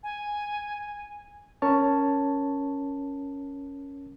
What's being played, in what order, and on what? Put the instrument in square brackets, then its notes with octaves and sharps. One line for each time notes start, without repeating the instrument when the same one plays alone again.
[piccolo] G#5
[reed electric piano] C#4 A#4 C#5 A5